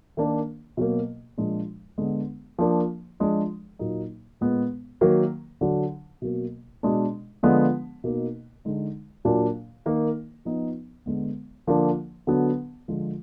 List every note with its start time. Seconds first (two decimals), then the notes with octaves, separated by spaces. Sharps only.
0.17 D#3 A#3 D4
0.77 B2 F#3 A#3
1.38 A#2 F3 G#3 D4
1.98 D3 G#3 B3 D4
2.59 F3 A#3 D4
3.20 F3 G#3 D4
3.79 A#2 F#3 A#3 D#4
4.41 A#2 G#3 B3
5.01 D#3 F#3 A#3
5.61 D3 F#3 D4
6.22 B2 F#3 A#3
6.83 B2 G#3 D4
7.43 D3 F3 G#3 B3 D4
8.04 B2 A#3 D#4
8.65 D3 G#3 D#4
9.25 A#2 F#3 A#3 D4
9.86 D#3 A#3 D#4
10.45 F3 B3 D#4
11.06 D3 G#3 B3
11.67 D3 F3 A#3 D4
12.27 D3 F#3 B3 D4
12.88 D3 F3 G#3